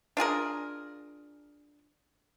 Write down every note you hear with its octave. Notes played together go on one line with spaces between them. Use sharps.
D4 F4 G#4 A#4